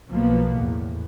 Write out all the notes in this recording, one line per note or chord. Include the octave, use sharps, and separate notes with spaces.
B1 F3 A#3 B3
E2 A2